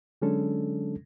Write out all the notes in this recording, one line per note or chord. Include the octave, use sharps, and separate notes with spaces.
D3 F#3 G#3 C#4 D4 A4